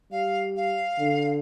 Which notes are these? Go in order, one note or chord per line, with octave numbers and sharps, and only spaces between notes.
G3 F5
F5
D3